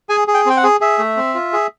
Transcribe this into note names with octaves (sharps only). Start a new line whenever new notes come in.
G#4 G#5
G#4
G5
C4 G5
F#5
G#4
G#4 E5
A3
C4
F4
G#4